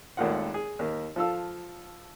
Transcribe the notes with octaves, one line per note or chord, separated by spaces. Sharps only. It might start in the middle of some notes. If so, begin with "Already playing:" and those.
G#1 D#2 A2 A#3 F4 F#5
G#4
D#2 A#3
F3 F4 A4 F5 E6